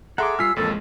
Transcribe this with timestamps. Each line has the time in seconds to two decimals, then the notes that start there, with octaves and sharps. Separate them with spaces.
0.18 G#4 A4 E5 F#5 A#5 C6 D6
0.39 G3 F4 G#5 E6 F6 B6 C7
0.56 A1 F2 G#3 A#3 A4